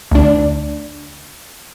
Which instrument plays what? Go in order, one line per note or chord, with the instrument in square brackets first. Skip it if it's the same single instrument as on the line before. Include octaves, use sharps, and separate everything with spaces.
[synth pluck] D2 D4